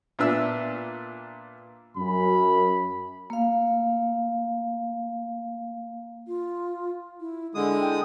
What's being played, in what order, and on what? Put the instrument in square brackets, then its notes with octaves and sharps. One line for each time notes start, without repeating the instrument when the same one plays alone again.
[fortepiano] A#2 B3 D4 E5 E6
[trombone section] F#2 [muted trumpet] B5
[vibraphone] A#3 F5
[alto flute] F4
E4
[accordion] D3 G#3 D#6 [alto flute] E4
[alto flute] G5